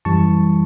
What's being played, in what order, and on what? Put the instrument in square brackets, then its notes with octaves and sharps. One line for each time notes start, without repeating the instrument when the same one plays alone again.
[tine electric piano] F#2 E3 G3 A5 C#6